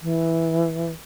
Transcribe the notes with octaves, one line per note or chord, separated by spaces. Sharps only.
E3